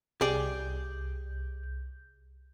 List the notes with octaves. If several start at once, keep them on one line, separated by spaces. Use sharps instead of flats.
C2 G4 G#4 D5 G6